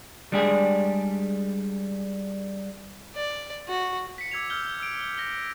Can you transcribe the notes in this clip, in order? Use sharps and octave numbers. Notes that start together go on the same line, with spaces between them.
G3 G#3 D4 G4 G#4
D5
F#4
B6 C#7
D6 E6 G#6 C#7 F7
E6 F6 G6 G7
E6 D7
E6 G7
A#6 G7